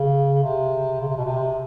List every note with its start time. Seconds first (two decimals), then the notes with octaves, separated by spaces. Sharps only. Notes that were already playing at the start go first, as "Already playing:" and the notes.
Already playing: C#3
0.43 C3
1.00 C#3
1.08 C3
1.17 B2
1.25 C3